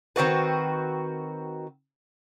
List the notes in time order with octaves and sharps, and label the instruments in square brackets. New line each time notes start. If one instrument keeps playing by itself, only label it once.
[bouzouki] D#3 C4 F#4 B4